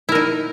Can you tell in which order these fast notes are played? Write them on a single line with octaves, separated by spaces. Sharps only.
E4 A#4 D#4